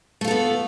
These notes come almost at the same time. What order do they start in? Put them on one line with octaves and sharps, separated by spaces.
A3 F4 A4 B3